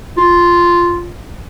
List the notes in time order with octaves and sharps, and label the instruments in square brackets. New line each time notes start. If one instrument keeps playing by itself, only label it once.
[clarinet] F4